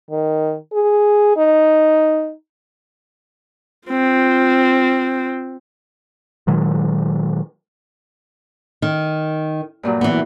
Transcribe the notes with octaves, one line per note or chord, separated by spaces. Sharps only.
D#3
G#4
D#4
C4 F4
A#2 D#3 F#3 G#3
D#3
G2 A#2 F#3
E3 B3